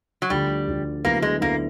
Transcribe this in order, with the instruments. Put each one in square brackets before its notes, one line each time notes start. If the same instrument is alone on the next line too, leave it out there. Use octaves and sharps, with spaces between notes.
[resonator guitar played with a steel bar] F#3
[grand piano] D2 D3 F3 [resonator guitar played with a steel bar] G3
[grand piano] D2 D3 F3
[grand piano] D2 D3 F#3 B3 E4 [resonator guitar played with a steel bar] A#3
[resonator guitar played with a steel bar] G#3
[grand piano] D2 D3 F#3 B3 E4 [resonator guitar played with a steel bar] A#3